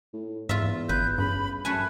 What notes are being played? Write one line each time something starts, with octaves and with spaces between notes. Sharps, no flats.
A2
E2 G#2 F4 E5
G#1 B4 G6
G2 C#3 B5
F#2 A3 B4 G#5 A5